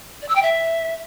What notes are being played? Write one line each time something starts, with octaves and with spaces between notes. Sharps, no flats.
D5
E6
G5
E5